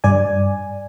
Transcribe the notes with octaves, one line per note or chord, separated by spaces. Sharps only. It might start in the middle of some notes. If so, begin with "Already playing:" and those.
G2 D5 G#5